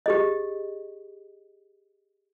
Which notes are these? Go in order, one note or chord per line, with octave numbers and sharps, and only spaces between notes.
G4 G#4 D#5